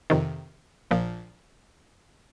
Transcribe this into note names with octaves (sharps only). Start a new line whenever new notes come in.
F2 C3 D#3
A#1 A#2 F3